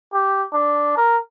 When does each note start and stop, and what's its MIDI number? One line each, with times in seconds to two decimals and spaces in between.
0.13 0.45 67
0.53 0.95 62
0.97 1.18 70